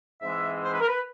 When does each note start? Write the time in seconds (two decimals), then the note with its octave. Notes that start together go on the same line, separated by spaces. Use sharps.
0.22 G#2 E3 G#3 C4 E5
0.63 C5
0.72 B4
0.80 A#4
0.88 B4